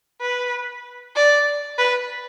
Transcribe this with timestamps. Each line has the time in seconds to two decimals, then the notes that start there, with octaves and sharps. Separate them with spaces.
0.21 B4
1.16 D5
1.79 B4